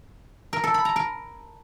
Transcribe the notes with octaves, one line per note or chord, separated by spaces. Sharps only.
A#4
A4
B5
A#5
A#4